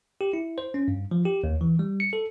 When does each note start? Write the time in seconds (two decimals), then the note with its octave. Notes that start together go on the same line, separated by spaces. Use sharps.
0.21 G4
0.33 E4
0.58 C5
0.74 C#4
0.88 G2
1.11 F3
1.25 G4
1.44 D#2
1.61 E3
1.79 G3
2.00 C#7
2.13 A4